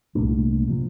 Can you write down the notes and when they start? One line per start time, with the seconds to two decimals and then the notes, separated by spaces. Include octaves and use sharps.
0.15 C2 A#2 A3 D4
0.68 C3 F3